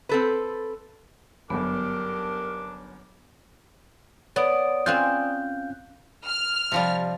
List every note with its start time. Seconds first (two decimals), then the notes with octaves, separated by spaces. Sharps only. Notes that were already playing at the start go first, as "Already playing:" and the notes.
0.09 C4 A4 B4
1.50 G1 F#2 B3 D4 G4 A4 A#4
4.36 B3 C#5 D5 D#6 D7
4.86 C4 C#4 F4 F5 F#6 G6
6.24 F6
6.72 C3 F3 G3